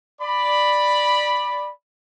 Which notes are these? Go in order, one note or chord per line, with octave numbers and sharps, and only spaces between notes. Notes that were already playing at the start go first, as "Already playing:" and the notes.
D5 B5